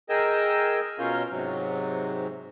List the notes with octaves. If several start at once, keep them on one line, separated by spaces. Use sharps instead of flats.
G#4 A#4 D#5 G5 G#5 E6
B2 C#4 F4 A#4 F5 G6
G#2 C3 F#3